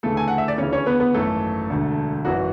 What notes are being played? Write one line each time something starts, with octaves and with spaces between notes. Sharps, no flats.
D2 C#3 E3 A3 A4
G#5
F#5
E5
D5
D2 C#3 E3 C#4 C#5
C#4 C#5
B3 B4
B3 B4
G#1 F#2 E3 A3 A4
E1 D2 D3
G#1 F#2 E3 F#4